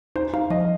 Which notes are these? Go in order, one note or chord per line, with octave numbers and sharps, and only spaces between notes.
D#4 C5
D#4 F5
F3 D#5